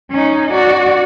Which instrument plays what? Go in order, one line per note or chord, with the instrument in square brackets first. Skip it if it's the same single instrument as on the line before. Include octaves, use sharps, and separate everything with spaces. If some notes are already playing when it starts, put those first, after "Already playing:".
[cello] C#4 D#4
F#4 D5